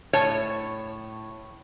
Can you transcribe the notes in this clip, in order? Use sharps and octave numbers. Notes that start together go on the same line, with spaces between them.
A2 C#5 A5